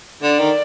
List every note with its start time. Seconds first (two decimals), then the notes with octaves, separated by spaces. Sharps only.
0.23 D3 D5
0.40 D#3